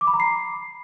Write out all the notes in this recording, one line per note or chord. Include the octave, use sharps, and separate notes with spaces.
D6
B5
A#5
C7